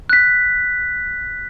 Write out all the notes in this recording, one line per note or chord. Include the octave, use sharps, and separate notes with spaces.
F#6 B6